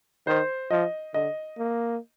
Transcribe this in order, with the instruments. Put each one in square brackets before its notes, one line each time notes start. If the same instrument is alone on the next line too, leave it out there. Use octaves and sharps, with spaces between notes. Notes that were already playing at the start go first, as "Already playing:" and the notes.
[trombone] D#3 [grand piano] C5
[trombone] F3 [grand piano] D#5
[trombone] D3 [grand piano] D#5
[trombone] A#3